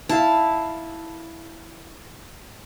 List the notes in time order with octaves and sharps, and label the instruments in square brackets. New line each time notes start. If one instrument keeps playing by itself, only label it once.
[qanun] E4 [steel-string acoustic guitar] F5 A5